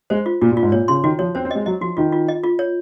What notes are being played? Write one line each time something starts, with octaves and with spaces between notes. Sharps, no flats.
G#3 C5
F4
A#2 F4
A#2
F4
G#2
A#2 C#5
C#3 C6
D#3 F#4
F3 C#5
C4 C5
C4
G#3 D#5
F#3 D#5
F3 F#4
D#3 F4
F4
D#5
F4
C#5